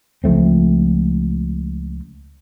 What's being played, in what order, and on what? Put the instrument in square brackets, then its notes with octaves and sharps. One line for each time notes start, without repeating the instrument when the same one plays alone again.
[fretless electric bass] C#2 F3 A3 C4